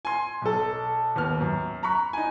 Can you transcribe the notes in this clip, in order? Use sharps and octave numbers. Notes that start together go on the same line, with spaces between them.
G#5 C6
B1 A4
D#2 B3 F6
F#2
A#5 B5 C#6 F#6
D#4 G#5